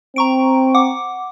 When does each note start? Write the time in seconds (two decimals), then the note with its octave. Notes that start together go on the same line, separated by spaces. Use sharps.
0.16 C4 A#5 C#6 D7
0.75 F#5 D6